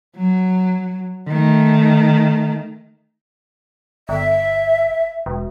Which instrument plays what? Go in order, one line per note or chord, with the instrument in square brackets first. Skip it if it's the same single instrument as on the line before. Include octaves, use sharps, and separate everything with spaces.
[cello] F#3
D#3 A3
[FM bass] G1 [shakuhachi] E5
[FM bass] E1